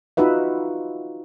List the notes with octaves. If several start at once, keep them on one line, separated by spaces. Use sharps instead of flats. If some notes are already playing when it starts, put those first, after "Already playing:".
D#4 F4 F#4 B4 E5